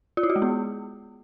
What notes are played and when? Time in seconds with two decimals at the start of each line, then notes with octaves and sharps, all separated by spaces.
0.17 F4
0.23 E4
0.30 F#4
0.36 G#3
0.42 B3